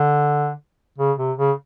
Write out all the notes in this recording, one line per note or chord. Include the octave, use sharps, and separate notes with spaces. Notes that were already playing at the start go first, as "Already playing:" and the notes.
Already playing: D3
C#3
C3
C#3